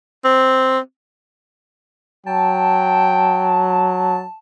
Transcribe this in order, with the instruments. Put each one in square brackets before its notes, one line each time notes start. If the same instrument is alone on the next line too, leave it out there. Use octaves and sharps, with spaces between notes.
[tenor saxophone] C4
[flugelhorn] F#3 [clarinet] G5 [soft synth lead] A5